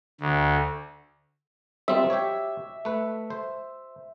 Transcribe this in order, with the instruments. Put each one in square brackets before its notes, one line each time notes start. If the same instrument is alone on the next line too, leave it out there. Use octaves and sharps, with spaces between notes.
[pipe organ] D2
[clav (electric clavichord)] G3 C4 F4 [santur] E5
[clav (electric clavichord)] G4 C#5
A3 B4
C5